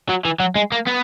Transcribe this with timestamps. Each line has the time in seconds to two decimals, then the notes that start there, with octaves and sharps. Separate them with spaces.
0.09 F#3
0.25 E3
0.40 F#3
0.56 G#3
0.72 A#3
0.87 B3